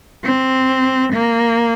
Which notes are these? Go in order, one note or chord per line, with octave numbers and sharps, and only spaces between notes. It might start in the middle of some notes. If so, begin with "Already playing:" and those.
C4
A#3